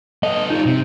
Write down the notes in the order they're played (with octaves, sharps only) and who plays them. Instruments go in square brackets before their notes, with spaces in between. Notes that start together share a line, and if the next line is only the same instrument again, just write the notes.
[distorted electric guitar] B3 A4 [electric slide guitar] D#5
[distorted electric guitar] G3 F4 [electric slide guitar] D#4
[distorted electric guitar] C3